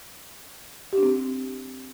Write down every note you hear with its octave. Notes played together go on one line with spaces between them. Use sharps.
G4
D4
C4